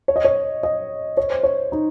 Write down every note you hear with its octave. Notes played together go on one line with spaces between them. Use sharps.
C#5
D#5
C#5
D#5
C#5
C5
C#5
D#4